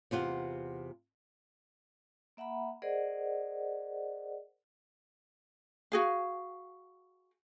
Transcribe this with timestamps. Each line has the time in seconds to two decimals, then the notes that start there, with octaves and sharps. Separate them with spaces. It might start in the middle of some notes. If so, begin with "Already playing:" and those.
0.11 E2 C3 F4 F#5
2.37 A#3 E5 F#5 A#5 B5
2.82 G#4 A#4 C5 D5 D#5 F#5
5.92 F#4 G#4 F5